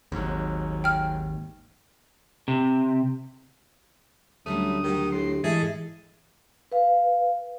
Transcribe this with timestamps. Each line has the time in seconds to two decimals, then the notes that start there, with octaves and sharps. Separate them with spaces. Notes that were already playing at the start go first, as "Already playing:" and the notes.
0.12 G#1 D#2 G#2 F#3
0.84 G5 F6
2.48 C3
4.46 D2 F#3 G3 A3 C#4 D#6
4.84 D#3 F#3 G4
5.12 A2 C6
5.44 G#2 E3 G#4 A4 D#5 E5
6.72 B4 F5